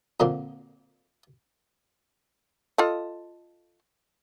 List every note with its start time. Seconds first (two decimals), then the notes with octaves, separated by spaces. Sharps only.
0.20 F2 A#2 D3 A#3 C4
2.78 F4 A4 D#5